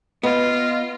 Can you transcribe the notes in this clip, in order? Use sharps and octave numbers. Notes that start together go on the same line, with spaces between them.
B3 F4 D#5